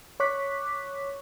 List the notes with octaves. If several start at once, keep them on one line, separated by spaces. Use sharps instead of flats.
C#5 C#6 D6 F#6 B6